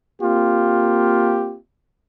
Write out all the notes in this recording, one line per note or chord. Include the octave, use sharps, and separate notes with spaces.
A#3 C4 F4 G4